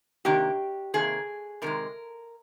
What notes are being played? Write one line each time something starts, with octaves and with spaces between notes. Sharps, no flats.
C3 D#3 A#3 D4 G4
C3 D#3 A#3 G#4
C3 D#3 G#3 A#4